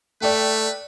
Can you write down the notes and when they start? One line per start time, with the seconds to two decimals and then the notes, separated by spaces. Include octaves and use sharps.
0.22 A3 B4 D5 G5